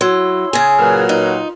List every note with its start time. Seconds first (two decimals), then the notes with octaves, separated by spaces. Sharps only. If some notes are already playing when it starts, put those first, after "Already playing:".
0.01 F#3 E4 C#5 C6 E6
0.53 C#3 G#4 G#5
0.79 A#2 F#3 A#4 B4 F6
1.09 D#4 F4